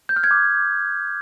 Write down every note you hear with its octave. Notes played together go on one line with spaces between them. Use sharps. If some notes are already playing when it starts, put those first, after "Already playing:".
G6
F6
G#6
D6